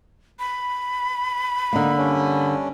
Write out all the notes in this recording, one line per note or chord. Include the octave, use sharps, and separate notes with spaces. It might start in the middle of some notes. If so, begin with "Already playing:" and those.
B5
D3 A#3 D#4
G2 C#4 D4